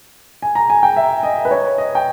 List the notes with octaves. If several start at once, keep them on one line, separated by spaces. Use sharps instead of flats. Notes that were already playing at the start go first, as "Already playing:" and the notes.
G#5
A#5
G#5
G5
E5
D#5
B4
C#5
D#5
G5